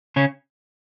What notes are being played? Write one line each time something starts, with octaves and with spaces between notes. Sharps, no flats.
C#3 C#4